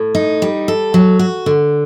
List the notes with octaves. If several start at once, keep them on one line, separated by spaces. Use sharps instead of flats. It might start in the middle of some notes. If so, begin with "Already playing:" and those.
Already playing: A2
D#4
G3
A4
F#3
F#4
D3